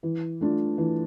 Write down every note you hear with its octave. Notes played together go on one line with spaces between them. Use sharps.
E3
A3 D4 F4
E3